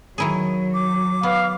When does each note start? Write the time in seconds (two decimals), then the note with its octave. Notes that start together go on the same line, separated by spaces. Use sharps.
0.18 D#3 F#3 E4 G#4
0.74 D6
1.23 B3 F5